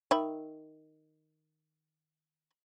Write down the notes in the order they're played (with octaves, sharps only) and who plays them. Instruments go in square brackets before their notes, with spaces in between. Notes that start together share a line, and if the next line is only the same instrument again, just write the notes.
[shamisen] D#3 E5 B5